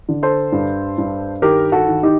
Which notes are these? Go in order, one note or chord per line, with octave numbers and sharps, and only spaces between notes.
D3
A4 C5
G2
G2
D#3 G4 A#4
F#4 A4
D#3
D#4 G4